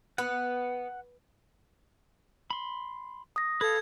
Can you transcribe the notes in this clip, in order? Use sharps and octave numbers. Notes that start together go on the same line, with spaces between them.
B3 F#5
B5 C6
D#6 A#6
A4 B4 F5 G#6